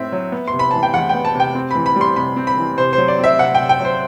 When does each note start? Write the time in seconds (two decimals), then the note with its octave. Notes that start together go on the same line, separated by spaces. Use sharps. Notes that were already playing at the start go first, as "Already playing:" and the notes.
Already playing: A2 C4 E5
0.12 F#3
0.32 B3
0.48 C6
0.53 C3
0.59 B5
0.71 E3 A5
0.83 G5
0.94 E2 F#5
1.09 B3 G5
1.25 A5
1.35 C3
1.40 G5
1.55 C4
1.71 E3 B5
1.86 B5
1.96 G3
2.01 C6
2.16 C3 B5
2.36 C4
2.47 B5
2.57 E3
2.78 C3 C5
2.93 C5
2.98 F#3
3.08 D5
3.19 C4 E5
3.39 C3 F#5
3.55 C3 G5
3.69 G5
3.80 F#3 C5